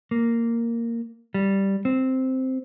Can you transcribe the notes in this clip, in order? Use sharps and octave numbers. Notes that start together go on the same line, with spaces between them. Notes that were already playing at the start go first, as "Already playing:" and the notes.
A#3
G3
C4